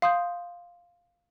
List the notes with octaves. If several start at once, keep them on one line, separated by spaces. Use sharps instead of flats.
F5 C6 D#6 G6